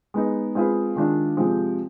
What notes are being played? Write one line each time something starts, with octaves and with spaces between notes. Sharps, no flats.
G#3 B3 D#4
G#3 C4 F4 G#4 B4
D#3 G#3 D4 F4
C3 F3 G#3 C4 G4